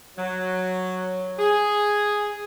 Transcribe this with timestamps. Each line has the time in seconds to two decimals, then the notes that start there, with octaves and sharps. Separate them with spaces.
0.18 F#3
1.39 G#4